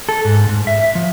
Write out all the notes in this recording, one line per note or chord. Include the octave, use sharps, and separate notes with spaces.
A4
G#2
G#2
E5
F3